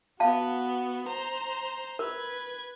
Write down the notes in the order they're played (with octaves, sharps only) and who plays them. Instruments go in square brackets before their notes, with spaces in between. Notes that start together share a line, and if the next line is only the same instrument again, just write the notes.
[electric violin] B3 F#4 [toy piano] F5 A5
[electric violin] C5 A#5
[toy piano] A#4 [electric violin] B4 G#6